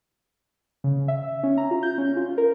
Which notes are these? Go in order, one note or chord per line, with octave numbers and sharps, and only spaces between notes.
C#3
E5
C#4
A#5
F4
G6
C#4
F4
A#4